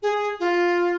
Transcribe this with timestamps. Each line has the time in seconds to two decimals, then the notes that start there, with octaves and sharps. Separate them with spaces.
0.03 G#4
0.40 F4